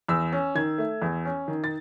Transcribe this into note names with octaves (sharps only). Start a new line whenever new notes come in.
E2 E6
C#4
D#3 G#6
A3
E2
C#4
D#3
A6